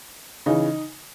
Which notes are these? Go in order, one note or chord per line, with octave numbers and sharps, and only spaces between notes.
C#3 E3 D#4